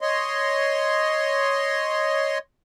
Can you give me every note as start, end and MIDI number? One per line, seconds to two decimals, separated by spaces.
0.01 2.38 73
0.01 2.38 75
0.01 2.38 84